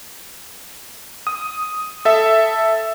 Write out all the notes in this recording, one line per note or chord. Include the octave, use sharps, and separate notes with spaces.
D#6
A4 E5